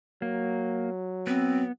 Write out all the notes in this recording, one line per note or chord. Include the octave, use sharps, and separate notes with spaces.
F#3 A#3
B3 C4